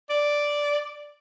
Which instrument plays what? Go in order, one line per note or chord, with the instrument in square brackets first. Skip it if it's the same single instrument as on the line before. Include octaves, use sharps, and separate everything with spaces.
[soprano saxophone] D5